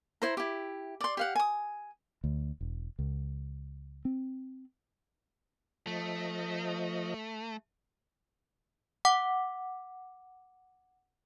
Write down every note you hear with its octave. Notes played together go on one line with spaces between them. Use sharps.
E4 C5 A#5
E4 G4
D5 C6
G4 F5 F#5
G#5 D#6
D2
E1
C#2
C4
F3 A3 D#5
F#5 D6